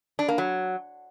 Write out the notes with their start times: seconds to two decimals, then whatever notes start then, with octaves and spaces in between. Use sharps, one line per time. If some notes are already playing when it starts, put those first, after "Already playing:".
0.19 D4
0.28 A#3
0.38 F#3